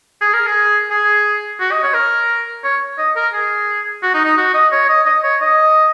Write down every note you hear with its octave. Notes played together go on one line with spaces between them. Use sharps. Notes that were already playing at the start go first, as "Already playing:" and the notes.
G#4
A#4
G#4
G#4
F#4
D#5
C#5
A#4
C#5
D#5
A#4
G#4
F#4
D#4
D#4
F#4
D#5
C#5
D#5
D#5
C#5
D#5